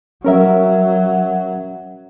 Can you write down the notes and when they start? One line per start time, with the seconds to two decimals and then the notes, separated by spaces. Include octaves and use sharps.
0.24 F#3 C#4 A#4 E5